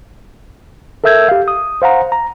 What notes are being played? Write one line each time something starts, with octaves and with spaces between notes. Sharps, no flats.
A4 A#4 E5 E6 G6 G#6
G4 F5
D#6
C5 F5 F#5 A#5
A#5